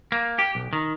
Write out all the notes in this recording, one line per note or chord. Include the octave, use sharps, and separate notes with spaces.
A#3
G4
B1
D#3